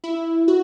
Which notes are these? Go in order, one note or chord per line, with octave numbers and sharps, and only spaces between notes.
E4
F#4